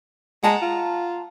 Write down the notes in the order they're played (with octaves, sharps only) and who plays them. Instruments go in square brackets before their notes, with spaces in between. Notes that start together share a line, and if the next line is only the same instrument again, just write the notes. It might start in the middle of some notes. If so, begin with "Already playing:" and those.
[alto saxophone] G#3 [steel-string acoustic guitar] F#5 A5 A#5
[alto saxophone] F4